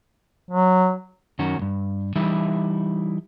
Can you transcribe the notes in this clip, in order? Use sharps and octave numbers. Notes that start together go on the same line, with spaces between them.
F#3
F#2 D#3 C#4 F#4
D2 G2
E3 G3 D#4 E4 E5